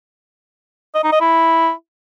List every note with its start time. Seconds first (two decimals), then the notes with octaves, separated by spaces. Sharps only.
0.95 D#5
1.04 D#4
1.12 D#5
1.21 E4